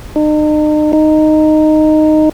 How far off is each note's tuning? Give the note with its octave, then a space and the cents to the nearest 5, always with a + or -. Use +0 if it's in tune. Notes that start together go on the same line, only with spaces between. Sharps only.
D#4 -40
D#4 -10